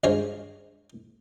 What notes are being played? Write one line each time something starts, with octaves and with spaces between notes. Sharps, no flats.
C#2 G2 G#3 C5 C#5 F5